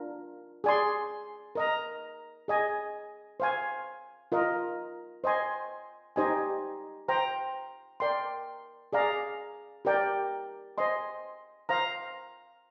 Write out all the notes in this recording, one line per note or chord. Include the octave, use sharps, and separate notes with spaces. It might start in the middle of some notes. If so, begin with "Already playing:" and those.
Already playing: D4 F4 A#4
G#4 D5 G#5 C6
A#4 D#5 A#5
G#4 D#5 G#5
C5 F5 G#5
F4 A#4 D#5
C5 D#5 G#5 C6
D#4 G4 C5 D#5 G#5
C5 G5 A#5
A#4 D5 G5 C6
G#4 D5 F5 A#5
G4 A#4 D5 G5
C5 D#5 G#5 C6
C5 F5 A#5